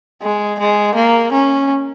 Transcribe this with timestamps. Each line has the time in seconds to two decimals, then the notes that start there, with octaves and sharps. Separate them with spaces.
0.22 G#3
0.59 G#3
0.95 A#3
1.32 C#4